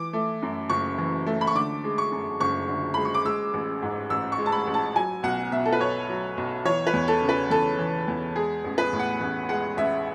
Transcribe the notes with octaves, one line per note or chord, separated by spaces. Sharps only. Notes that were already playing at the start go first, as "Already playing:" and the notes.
Already playing: E3 D6
A3
F#2
F#1 C#6
E3
A3
B5
C#6
D3 D6
G#3
C#6
F#2
F#1 C#6
D3
G#3 B5
C#6
D6
G#3 E6
A1
G#2
A1 E6
C#6
G#3
A5
B5
A1
A5
F#3 G#5
B1 F#5
B2 E5
A4
B4
B1 C#5
F#3
B1
E3 C#5
B4
E2
A4
C#3
B4
E2 A4
E3
E2
G#3 G#4
A1
B4
A2
F#5
A1
G#3 F#5
A1 E5